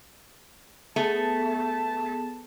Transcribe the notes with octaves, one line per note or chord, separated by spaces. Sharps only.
A3 B3 G#4 A5